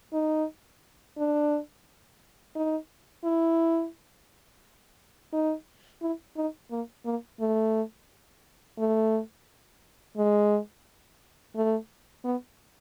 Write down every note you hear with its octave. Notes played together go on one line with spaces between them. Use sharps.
D#4
D4
D#4
E4
D#4
E4
D#4
A#3
A#3
A3
A3
G#3
A3
B3